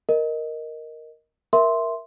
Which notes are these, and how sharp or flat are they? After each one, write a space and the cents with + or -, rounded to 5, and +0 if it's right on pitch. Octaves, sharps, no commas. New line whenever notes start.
A#4 +0 D#5 +0
A#4 +10 E5 +0 C6 +0